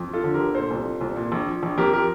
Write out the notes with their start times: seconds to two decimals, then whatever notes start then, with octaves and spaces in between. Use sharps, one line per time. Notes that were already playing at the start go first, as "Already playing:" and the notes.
Already playing: F2
0.09 F3 F4 A4
0.24 D3
0.34 G4 A#4
0.40 G1
0.55 A#2 A4 C5
0.70 C2
0.85 F3
1.01 C2
1.16 A#2
1.32 A#1
1.47 F3
1.63 A#1
1.78 F2 G4 A#4
1.93 F3 G4 A#4